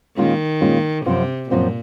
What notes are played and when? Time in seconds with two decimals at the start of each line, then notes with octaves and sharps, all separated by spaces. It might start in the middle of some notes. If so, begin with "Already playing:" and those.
0.17 A#2 D#3 G#3 C#4 F4
0.61 A#2 G#3 C#4 F4
1.06 F#2 C3 F3 C4 F4
1.50 F#2 A#2 F3 C4 F4